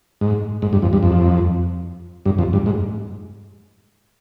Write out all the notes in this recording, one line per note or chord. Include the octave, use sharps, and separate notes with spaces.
G#2
G#2
G2
F2
G2
F2
G2
F2
G2
G#2